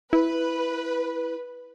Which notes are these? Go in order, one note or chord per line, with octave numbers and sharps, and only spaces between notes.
E4 B4